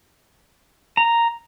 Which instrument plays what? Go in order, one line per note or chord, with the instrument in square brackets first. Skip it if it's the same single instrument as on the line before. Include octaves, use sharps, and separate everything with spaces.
[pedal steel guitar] A#5